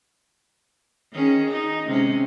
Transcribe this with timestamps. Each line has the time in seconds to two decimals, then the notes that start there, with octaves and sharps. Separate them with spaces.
1.13 D#3 C#4 G#4
1.50 D#4
1.87 C3 G#3 C#4